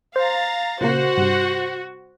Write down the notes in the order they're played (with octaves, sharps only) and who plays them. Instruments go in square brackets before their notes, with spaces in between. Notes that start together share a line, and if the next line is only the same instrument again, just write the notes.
[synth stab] C5 [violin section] F5 A#5 A6
[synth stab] A#2 C#3 A#3 [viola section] F#4 [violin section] C5 F#5
[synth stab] G2 C3